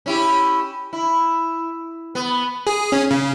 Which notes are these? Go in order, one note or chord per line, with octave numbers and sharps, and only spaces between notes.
C#4 E4 G4
E4
B3
G#4
C#4
C#3